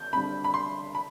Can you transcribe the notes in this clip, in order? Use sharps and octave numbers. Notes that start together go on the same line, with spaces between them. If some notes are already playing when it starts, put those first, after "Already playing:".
Already playing: G6
D3 G3 C4 B5
B5
C6
B5